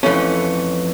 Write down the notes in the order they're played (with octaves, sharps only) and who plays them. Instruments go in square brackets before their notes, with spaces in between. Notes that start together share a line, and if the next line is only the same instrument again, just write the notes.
[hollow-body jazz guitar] F2 E3 A3 C#4